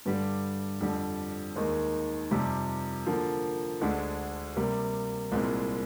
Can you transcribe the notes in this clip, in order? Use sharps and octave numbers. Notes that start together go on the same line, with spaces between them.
G2 D3 G3
F2 D3 G3
D#2 D#3 G#3 D#4
F2 C3 G3
D3 F3 A#3
D2 D3 G#3 D4
C3 G3 A#3
C2 A#2 G#3 C4